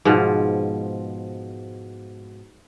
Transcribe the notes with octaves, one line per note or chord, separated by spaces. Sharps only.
G#2 B2 F3